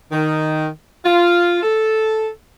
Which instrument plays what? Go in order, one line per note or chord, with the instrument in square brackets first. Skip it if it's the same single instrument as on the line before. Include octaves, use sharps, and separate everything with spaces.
[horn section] D#3
F4
A4